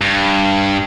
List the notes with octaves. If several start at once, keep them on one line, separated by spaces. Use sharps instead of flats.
G2